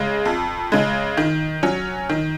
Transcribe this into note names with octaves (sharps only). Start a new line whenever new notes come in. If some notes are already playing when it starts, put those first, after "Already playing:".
Already playing: C#3 G#3
F2
C#3 G#3
D#3
F#3 C#4
D#3